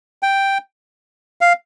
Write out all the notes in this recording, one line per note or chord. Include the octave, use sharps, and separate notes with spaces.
G5
F5